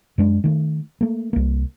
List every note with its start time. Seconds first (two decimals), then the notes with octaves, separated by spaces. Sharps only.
0.18 F#2 G#3 D4
0.44 D#3 A3
1.01 A3 A#3
1.33 C2 A#3